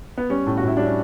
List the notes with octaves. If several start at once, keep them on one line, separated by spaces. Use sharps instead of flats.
B3
G3 C#4
A2
F#4
A2 E4
G3 D4
C#4